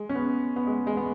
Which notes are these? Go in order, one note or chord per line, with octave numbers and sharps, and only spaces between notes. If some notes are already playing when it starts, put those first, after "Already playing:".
Already playing: G#3
C#4
B3
B3
G#3
G#3
B3